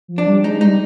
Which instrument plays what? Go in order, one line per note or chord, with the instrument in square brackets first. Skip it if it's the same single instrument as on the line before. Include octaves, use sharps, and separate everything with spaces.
[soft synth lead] F3
[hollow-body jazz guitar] D4
[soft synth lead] G3
[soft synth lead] G#3 [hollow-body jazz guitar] D#4
[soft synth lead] G3 [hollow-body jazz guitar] D#4